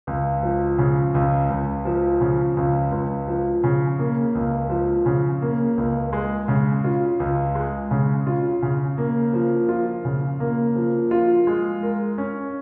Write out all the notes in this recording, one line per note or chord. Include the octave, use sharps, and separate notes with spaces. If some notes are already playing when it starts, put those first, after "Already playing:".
C#2
F3
C#3
C#2
C#2
F3
C#3
C#2
C#2
F3
C#3
A#3
C#2
F3
C#3
A#3
C#2
G#3
C#3
F4
C#2
G#3
C#3
F4
C#3
A#3
F3
F4
C#3
A#3
F3
F4
G#3
A#4
C#4